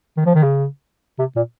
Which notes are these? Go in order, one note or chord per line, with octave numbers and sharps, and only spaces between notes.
D#3
F3
D#3
C#3
C3
A#2